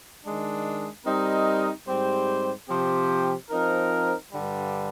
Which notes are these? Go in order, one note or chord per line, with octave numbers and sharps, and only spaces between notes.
D#3 G#3 D4
G3 C4 D#4 A#4 D#5
G#2 G3 C4 G4 C5
C3 F3 C4 G4
F3 C4 D#4 A#4
G2 D3 G3